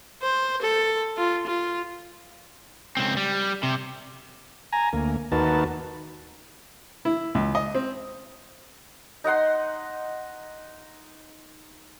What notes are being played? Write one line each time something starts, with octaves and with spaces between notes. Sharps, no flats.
C5
A4
F4
F4
C#2 C4
G3
C3
G#5 A#5
D2 A#3
D#2 D#4 F#4 A#4 B4 A5
E4
C#2
D#5
C4
D#4 D#5 F#5 C6